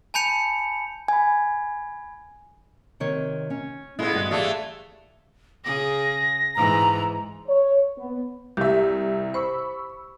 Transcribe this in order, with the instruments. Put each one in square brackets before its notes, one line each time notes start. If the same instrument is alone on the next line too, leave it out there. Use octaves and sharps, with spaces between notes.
[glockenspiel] G#5 A5 B5 G6 C#7 F7
[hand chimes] G#5 B5
[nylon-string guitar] C3 D#3 C#5
C#4
[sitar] G#3 B3 [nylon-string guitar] E4 F4 A4
[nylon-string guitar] D2 G2 G3
[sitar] E3 A3 [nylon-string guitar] G4 D5 F5
[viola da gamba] C#3 G#4 [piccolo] A#6
[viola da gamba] G#2 E3 [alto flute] A#5
[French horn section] C#5
B3
[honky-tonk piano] C2 E5 [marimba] G4
[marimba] C5 [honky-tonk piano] B5 C#6 E6